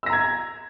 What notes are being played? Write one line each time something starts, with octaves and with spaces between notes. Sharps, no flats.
A#5 E6 G#6 A#6